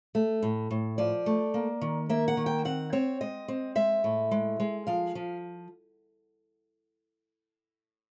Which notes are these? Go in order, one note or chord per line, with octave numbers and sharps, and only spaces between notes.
A3
A2
A2
F3 D5
A3
A#3
D#3
A#3 E5
F#5
D#3
G5
C4 F#5
C4 C#5
G#3 D#5
C4
G#3 E5
A2
G#3
G#3
F3 F5
F3